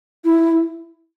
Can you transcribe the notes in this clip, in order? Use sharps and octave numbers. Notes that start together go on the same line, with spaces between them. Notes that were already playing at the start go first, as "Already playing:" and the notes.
E4